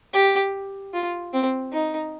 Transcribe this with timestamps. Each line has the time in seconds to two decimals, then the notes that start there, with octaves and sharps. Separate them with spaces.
0.13 G4
0.94 F4
1.33 C4
1.73 D#4